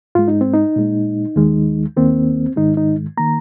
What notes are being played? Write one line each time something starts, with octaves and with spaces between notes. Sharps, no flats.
G#2 G#3 F4
D#4
C4
D#4
A#2 G#3
D#2 D#3 G#3
D#2 D#3 A#3 C4
G#2 D#3 G#3 D#4
D#4
D#3 A#3 A#5